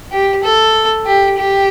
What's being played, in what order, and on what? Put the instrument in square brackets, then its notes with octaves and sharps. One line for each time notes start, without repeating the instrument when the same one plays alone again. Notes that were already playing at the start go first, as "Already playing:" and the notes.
[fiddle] G4
A4
G4
G4